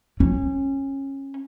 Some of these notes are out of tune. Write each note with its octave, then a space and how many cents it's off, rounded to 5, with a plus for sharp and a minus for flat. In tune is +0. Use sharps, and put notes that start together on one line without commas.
C#4 -25